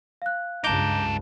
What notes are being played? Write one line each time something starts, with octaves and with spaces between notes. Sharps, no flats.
F5 F#6
C#2 G2 D#4 A4 A#5 D6 G6